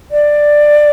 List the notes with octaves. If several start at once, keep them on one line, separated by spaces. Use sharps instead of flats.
D5